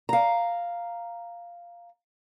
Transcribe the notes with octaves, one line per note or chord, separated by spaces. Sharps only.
F5 A#5